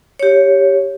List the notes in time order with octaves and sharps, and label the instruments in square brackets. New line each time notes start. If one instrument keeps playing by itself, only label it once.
[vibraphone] G4 C#5